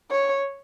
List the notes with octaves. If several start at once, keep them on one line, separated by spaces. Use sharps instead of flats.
C#5